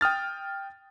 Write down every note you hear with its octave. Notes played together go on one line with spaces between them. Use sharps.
G5 D#6 F6 A6